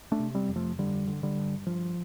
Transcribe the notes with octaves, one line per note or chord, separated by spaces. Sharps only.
A3 D4
C3
G3 C4
F2
F3 A3
G2 D3 G3
D3
D3 G3
G2
G2 F3